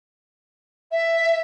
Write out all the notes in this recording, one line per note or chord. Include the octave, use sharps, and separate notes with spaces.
E5